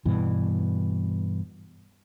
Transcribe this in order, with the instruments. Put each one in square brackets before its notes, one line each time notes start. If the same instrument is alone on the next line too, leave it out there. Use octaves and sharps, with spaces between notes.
[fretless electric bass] G2 B2 E3